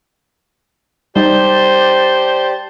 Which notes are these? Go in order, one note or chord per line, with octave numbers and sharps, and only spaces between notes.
G3 D#4 G4 C5 D5 A5